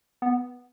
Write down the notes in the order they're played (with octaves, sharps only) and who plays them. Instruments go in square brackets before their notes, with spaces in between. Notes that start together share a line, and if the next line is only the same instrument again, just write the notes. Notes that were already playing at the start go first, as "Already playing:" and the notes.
[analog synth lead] B3